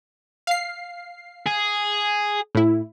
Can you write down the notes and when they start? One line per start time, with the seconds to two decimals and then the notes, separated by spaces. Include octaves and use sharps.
0.47 F5 C7
1.47 G#4
2.55 A2 E4